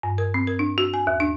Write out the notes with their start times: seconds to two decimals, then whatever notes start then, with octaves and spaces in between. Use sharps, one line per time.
0.03 G2
0.18 A#4
0.34 C4
0.47 A#4
0.59 D4
0.78 F#4
0.94 G#5
1.07 D#2
1.20 D4